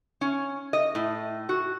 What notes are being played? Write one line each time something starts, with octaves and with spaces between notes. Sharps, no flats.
C#4
D#5
A2
F#4